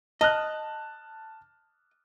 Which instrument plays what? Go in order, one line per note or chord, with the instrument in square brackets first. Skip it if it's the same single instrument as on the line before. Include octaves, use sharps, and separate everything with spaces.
[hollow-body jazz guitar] D#5 [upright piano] A5 F6 F#6